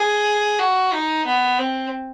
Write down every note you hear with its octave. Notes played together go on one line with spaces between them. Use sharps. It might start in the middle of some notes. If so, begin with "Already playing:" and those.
Already playing: G#4
F#4
D#4
B3
C4